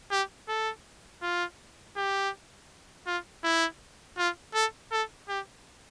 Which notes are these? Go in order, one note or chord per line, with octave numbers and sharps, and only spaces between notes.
G4
A4
F4
G4
F4
E4
F4
A4
A4
G4